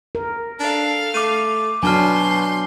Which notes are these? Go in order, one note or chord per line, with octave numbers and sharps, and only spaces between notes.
A#4
D4 A4 F5
A3 D6 D#7
B2 F#3 D4 G#5 A5 C6 F6 G6